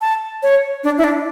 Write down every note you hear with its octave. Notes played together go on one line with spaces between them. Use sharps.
A5
C#5
D4
E4
D4